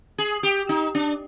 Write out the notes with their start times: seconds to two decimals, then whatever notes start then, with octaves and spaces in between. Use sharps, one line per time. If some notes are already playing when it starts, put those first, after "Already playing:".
0.18 G#4
0.43 G4
0.69 D#4
0.95 D4